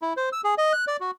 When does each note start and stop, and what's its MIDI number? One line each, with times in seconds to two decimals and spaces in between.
0.02 0.13 64
0.17 0.29 72
0.32 0.41 88
0.44 0.54 68
0.58 0.73 75
0.73 0.85 90
0.87 0.97 74
1.00 1.11 66